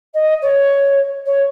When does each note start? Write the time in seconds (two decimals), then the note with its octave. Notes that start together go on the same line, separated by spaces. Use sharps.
0.14 D#5
0.41 C#5
1.25 C#5